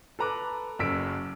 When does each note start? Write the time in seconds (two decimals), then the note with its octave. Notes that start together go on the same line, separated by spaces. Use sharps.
0.19 A4 B4 A#5 D6 F#6
0.79 F#1 F#2 E6 B6 D7